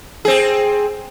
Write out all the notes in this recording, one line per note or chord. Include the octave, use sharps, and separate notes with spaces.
C4 G#4